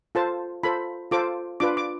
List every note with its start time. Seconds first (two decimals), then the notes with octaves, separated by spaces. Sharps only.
0.15 F4 A4 C5 A5
0.63 F4 A4 C5 B5
1.11 F4 A4 C5 D6
1.60 D4 F4 B4 D6
1.77 D6